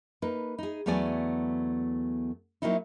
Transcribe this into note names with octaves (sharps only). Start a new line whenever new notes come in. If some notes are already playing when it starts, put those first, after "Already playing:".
A#3 D#4 B4
D#4 G#4
E2 F#3 A3 B3 D5 G#5
F#3 A#3 C4 D#4 E4